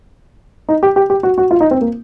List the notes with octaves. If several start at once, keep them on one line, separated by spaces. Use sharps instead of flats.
D#4
G4
G4
G4
F#4
F#4
F4
D#4
C4
A#3